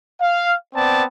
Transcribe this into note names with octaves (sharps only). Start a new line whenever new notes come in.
F5
B3 C4 D5 A5